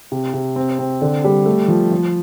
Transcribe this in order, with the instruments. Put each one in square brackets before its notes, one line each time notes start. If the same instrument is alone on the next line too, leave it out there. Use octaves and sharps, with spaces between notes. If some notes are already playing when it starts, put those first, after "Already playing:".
[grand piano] C3
C3
C4
C4
D3
G3
A3
F3
F3